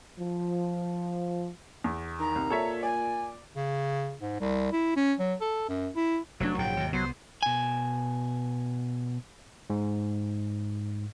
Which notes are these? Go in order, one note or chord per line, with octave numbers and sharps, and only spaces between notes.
F3
E2
D#3 A#5
C2
A#2 A4 C#5 E5
D5 G#5
C#3
G#2
C2
E4
C#4
F#3
A4
F#2
E4
F1 F#3 A3 D4
A#1 G#2 C#3 G5
D#2 G#2 C3
C2 F#3 B3 C5
B2 G#5
G#2